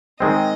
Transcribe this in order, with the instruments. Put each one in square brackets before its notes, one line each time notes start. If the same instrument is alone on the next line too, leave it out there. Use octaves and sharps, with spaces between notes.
[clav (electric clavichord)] D#3 G#3 C4 [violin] D#5